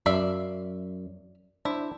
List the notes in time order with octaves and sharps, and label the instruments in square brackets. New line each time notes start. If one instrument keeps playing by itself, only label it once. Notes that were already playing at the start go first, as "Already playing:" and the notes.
[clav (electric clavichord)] F#2 [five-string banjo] D5 E5 F5
[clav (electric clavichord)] D4 C5 [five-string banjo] E4